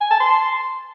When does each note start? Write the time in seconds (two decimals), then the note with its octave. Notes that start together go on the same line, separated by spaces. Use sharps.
0.01 G#5
0.11 A5
0.20 C6